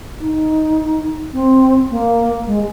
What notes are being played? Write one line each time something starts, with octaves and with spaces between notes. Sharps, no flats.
D#4
C4
A#3
G#3